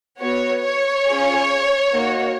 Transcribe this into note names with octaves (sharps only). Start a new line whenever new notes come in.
B3 F#4 C#5
C#5
C#4 F4 G#4
A#3 D#4 F#4